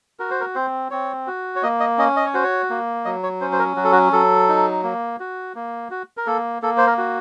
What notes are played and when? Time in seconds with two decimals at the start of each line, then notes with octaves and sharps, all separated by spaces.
0.19 F#4 A#4
0.31 C5
0.40 A#4
0.55 C4 C5
0.91 C4 C#5
1.27 F#4
1.56 C#5
1.63 A#3 D#5
1.80 D#5
1.98 C#4 D#5
2.17 D#5
2.26 C#5
2.34 F#4 C5
2.43 C#5
2.70 A#3
3.05 F#3 D#5
3.23 C#5
3.41 C#4 C5
3.52 C5
3.59 A#4
3.77 F#3 F#4
3.84 A4
3.92 F#4
4.13 F#3 A4
4.49 D#4
4.84 A#3
5.20 F#4
5.55 A#3
5.91 F#4
6.17 A#4
6.27 A#3 A4
6.62 A#3 A4
6.77 C5
6.87 A#4
6.98 F#4